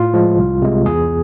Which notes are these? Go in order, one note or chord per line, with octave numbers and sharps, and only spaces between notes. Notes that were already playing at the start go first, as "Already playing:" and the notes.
Already playing: A2 F4
F3 G#3
C2
C3 G#3
E2 G#4